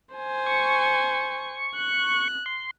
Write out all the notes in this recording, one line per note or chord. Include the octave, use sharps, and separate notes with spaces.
C5 G#5
C#6
F#6
C6